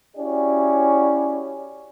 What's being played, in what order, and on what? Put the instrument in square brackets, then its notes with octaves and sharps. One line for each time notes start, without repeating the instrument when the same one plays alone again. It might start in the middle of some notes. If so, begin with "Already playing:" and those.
[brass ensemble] C#4 E4 F#4 G4 C#5 D5